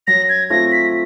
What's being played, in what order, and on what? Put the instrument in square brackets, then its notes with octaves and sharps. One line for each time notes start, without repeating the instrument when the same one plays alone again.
[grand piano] F#3 [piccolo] A#6
[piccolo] G#6
[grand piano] A3 C4 F4 [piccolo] A#6
[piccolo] B6